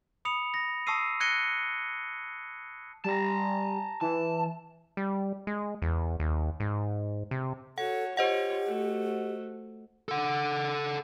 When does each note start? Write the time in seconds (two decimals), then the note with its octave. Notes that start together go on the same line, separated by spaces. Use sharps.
0.25 B5 D#6 C#7 F7
0.54 A#6
0.87 A5 C#6 D#6 E6 C7 D#7
1.20 F#6 G#6 A#6 C#7 D#7 G7
3.04 G3 A5 A#5
4.01 E3 A5
4.97 G3
5.47 G#3
5.82 E2
6.20 D#2
6.60 G#2
7.31 C3
7.78 F#4 A4 C#5 F#5
8.17 F4 G4 C5 C#5 D#5 F#5
8.66 A3 F#4
10.09 A4 F#5